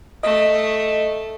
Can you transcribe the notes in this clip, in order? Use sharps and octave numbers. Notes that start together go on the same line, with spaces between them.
A3 D#5